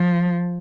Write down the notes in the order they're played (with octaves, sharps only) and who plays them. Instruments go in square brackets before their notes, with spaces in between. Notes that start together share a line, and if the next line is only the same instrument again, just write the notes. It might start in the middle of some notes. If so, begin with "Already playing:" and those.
Already playing: [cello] F3